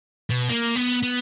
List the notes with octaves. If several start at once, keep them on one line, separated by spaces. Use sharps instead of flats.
B2
A#3
B3
B3